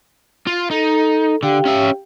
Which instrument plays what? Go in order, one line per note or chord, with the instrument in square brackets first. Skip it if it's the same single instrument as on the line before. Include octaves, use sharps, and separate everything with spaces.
[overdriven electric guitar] F4
[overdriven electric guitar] D#4 [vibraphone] A4
[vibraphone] A4
[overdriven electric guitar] D3 [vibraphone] G4 F5 G5
[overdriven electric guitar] C#4 E5